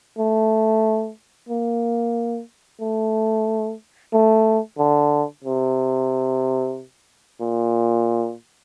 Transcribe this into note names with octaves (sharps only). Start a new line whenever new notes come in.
A3
A#3
A3
A3
D3
C3
A#2